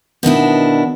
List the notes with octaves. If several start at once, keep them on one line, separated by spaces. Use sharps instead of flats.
B2 D#3 D4 E4